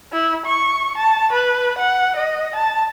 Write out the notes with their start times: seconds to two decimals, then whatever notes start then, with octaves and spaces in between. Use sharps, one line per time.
0.12 E4
0.45 C#6
0.97 A5
1.33 B4
1.78 F#5
2.16 D#5
2.55 A5